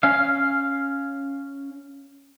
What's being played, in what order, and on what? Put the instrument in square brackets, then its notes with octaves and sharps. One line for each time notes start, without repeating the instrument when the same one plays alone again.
[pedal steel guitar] C#4 F5